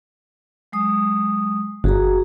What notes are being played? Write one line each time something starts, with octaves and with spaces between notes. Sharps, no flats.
F#3 G#3 D#6
G1 F#4 G#4 A#5